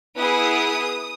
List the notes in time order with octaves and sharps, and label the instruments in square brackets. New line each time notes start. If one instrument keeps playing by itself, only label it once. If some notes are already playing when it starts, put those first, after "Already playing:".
[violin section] B3 E4 G#4 D#6